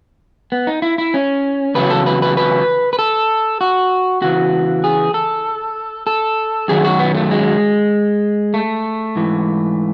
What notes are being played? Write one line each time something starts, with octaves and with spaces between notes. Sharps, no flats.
B3
D#4
E4
E4
C#4
E2 C#3 F#3 B4
A4
B4
B4
B4
B4
A4
F#4
E2 C#3 E3 F#4
G#4
A4
A4
F#2 D#3 F#3 G#4
F#4
B3
A3
G#3
A3
G#2 E3